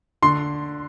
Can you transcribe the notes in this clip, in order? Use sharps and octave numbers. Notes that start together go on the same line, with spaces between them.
D3 C6